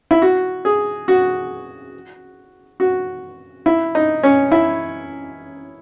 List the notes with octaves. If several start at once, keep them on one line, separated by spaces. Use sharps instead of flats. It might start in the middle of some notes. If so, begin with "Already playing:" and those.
E4
F#4
G#4
F#4
F#4
E4
D#4
C#4
E4